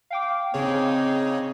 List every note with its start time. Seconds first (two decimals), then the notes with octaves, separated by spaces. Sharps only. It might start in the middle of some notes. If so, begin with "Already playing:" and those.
0.10 F5 G5 D6
0.54 C#3 C4 D#4 G#4 C#5